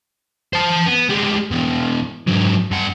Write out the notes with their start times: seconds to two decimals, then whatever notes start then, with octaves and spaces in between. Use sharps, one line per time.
0.53 C5 A5
0.87 B3
1.10 G3 G#3
1.51 B2 E3
2.28 G#2 F#3
2.71 G2 F#5